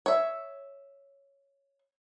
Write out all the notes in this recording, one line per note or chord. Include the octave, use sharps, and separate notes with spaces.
C#5 E5